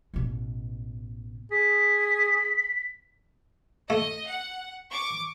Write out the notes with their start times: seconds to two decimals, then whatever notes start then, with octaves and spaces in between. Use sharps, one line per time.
0.14 A1 B2
1.51 G#4 B6
3.90 A3 D#5
4.26 F#5
4.90 C#6 D6